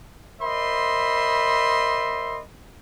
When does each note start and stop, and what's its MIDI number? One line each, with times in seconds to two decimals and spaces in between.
0.41 2.40 70
0.41 2.40 72
0.41 2.40 75
0.41 2.40 76
0.41 2.40 83
0.41 2.40 84